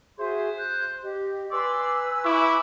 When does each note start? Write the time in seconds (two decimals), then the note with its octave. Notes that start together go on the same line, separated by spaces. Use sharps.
0.19 F#4 G#4 C5 E5
0.58 F#6 G6
1.03 G4 D#5
1.51 B4 D5 G#5 C6 E6
2.25 E4 C#6 D6